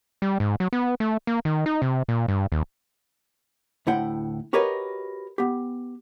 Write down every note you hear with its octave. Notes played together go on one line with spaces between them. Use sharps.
G3
G#2
F#3
B3
A3
A#3
D#3
D#4
C3
A#2
G2
D#2
D2 A2 E4 F#5 G5
F#4 G4 A#4 B4 C#5 D#5
B3 G4